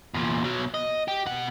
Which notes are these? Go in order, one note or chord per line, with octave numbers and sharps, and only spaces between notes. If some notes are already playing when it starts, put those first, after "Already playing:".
E2 A#2
B2 F#3
D#5
G4
B2 F#5